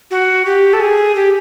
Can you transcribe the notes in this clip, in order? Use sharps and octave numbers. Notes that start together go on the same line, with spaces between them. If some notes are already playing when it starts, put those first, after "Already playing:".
F#4
G4
A4
G#4
G4